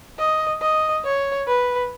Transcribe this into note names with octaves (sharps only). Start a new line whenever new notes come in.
D#5
D#5
C#5
B4